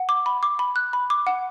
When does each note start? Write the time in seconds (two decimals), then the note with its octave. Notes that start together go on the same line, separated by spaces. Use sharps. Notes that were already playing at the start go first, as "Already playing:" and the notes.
Already playing: F#5
0.09 D6
0.26 B5
0.43 D6
0.59 B5
0.76 F#6
0.93 B5
1.10 D6
1.27 F#5